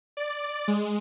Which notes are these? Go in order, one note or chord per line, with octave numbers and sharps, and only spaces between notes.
D5
G#3